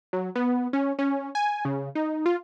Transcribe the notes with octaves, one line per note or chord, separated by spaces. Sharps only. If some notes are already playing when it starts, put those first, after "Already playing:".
F#3
B3
C#4
C#4
G#5
C#3
D#4
F4